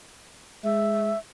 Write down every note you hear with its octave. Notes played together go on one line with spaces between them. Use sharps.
G#3 E5